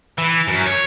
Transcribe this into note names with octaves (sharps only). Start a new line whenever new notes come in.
E3
F#2
C#5